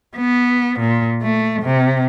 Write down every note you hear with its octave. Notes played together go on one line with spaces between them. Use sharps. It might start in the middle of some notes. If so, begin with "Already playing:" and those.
B3
A#2
A3
C3